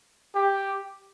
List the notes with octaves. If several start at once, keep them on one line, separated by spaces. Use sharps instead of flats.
G4